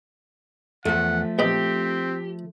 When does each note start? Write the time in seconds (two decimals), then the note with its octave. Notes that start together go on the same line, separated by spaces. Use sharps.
0.85 E2 F3 A3 F#5
1.39 A#1 B3 C4 G4 D#5